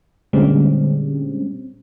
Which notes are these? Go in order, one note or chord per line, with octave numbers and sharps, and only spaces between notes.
A#2 D3 G3 G#3 C4 C#4